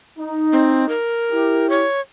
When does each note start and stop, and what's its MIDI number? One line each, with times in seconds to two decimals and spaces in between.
0.19 0.95 63
0.53 0.88 60
0.89 1.69 70
1.31 1.85 64
1.31 1.85 67
1.70 2.00 73